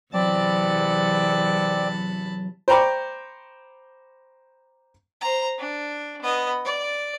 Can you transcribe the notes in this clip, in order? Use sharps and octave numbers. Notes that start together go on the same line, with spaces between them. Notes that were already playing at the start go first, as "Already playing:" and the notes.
E2 C3 F#3 C4 D5 A5 B5
C5 G5 A#5 B5 C#6 D6
C5 A#5
D4
B3 D#5
D5